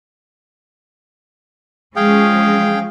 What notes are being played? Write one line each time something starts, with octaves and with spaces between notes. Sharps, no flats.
F3 G#3 C#4 G#4 F5 G5